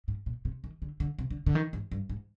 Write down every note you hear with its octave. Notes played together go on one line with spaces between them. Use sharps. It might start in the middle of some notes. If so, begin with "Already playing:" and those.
G#2
A#2
C3
D#3
D3
D3
C3
D3
D3
D#3
G#2
G2
G#2